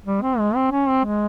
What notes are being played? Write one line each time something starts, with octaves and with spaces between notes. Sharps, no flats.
G3
C4
G#3
C4
C#4
C4
G#3